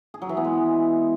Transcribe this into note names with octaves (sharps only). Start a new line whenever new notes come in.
G#4
F#3
E3
B3
G#3